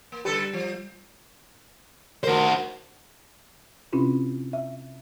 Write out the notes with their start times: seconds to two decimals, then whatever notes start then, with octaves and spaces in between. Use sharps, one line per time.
0.12 A#3
0.25 D3 G3 A4 B4
0.53 F3
2.23 F#4 A#4 C5
3.92 C3 C4 C#4 E4 F4 G4
4.53 E5